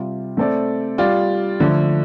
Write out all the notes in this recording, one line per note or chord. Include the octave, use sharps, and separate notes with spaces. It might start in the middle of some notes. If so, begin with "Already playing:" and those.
Already playing: C3 G3 F4
A3 C4 A4 D5
G3 F4 D5
D3 F3 A3